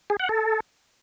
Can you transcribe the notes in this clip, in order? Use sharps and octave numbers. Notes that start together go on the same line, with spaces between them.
G#4
F#5
A4